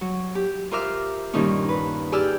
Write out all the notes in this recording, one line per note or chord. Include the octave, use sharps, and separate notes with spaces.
F#3
G4
F4 A#4 C5 E5 D6 F6
G2 A#2 D#3 C#4 D#4 F4
B4
G4 G#4 D5 G5 E6 F6